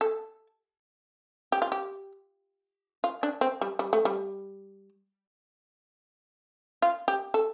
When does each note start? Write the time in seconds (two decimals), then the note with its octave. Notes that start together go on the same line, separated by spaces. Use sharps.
0.01 A4
1.52 G4
1.62 F4
1.72 G4
3.04 F4
3.23 D4
3.41 C4
3.61 G3
3.79 G3
3.93 A3
4.05 G3
6.82 F4
7.08 G4
7.34 A4